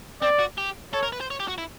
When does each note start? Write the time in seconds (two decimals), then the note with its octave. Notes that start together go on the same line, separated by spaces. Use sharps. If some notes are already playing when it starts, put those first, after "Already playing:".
0.22 C4 D5
0.39 F#4
0.58 G4
0.93 A4 C#5
1.03 A#4
1.12 B4
1.21 C5
1.30 C#5
1.40 G4
1.48 F#4
1.58 E4